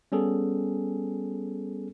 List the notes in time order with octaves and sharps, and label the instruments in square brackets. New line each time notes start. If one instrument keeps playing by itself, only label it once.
[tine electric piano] G3 B3 C#4 G#4 A4